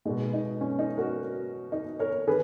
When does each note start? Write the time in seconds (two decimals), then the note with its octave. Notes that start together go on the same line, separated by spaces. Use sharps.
0.05 G#3 D#4
0.09 B2
0.33 D#4
0.61 C#4
0.79 D#4
0.97 F#4 A#4
1.72 D#4
1.99 A#4 C#5
2.27 D#3 G#4 B4